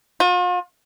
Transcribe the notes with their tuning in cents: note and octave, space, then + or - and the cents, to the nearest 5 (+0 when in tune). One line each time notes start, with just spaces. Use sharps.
F4 +45